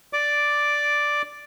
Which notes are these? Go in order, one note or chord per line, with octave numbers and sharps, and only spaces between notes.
D5 D6